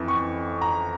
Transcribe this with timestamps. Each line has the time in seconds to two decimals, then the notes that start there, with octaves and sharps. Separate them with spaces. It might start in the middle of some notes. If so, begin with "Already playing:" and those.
Already playing: F2 E3
0.08 C#6
0.62 A#5